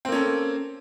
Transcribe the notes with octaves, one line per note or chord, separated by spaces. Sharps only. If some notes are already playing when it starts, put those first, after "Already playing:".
A#3 C4 C#4 A4